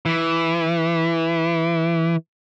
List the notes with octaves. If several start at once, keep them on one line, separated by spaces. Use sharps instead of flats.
E3